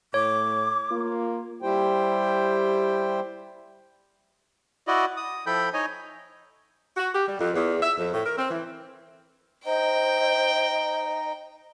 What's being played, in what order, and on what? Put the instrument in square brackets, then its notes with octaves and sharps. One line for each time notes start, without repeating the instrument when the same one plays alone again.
[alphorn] A2 [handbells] C#5 [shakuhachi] D6
[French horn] A#3 [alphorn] F4
[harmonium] G3 E4 G4 C5 G5
[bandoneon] E4 F#4 D5 D#5
D#6
F3 E4 A4 G5 B5 G6
D#4 C#5 D#5 G#5
[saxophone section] F#4
G4
G3
F2
E2
E5
F2
A2
A#4
C4
E3
[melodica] D#4 [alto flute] C5 [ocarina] D#5 [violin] G5